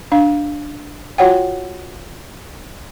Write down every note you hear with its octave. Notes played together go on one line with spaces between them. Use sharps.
D4 F5
F4 F#4 C#5 F#5 G5